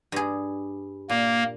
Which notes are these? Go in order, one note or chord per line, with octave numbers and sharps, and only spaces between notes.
G2 G#4
A#2 A#3